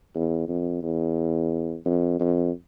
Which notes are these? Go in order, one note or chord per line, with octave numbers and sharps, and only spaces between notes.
E2
F2
E2
F2
F2